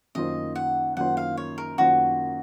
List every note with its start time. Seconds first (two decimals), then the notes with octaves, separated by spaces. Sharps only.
0.15 F#2 D#3 A#3 F4 C5 D#5
0.56 F#5
0.97 F#2 D#3 A#3 F4 C5 F#5
1.17 F5
1.37 C#5
1.58 A#4
1.78 F#2 D#3 A#3 F4 F#4 C5